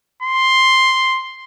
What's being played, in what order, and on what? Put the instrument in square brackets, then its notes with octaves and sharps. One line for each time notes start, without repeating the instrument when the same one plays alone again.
[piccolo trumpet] C6